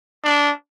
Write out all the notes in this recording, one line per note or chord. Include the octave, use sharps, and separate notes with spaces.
D4